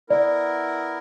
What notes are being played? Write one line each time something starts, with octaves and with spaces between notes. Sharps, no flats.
B3 E4 A#4 D5